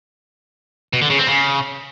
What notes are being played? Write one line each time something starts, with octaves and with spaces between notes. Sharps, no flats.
B2
D3
C#3
C4
C#3